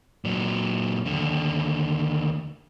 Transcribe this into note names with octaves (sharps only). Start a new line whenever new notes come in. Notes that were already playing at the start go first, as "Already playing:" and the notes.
A#2 F#3
D#2 D3